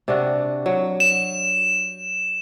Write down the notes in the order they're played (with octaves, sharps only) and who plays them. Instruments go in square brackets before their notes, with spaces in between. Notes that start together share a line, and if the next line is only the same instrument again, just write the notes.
[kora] C3 D4 F#4
F#3
[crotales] E7